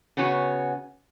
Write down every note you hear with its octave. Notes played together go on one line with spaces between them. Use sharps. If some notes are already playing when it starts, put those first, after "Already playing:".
C#3 B3 C#4 F#4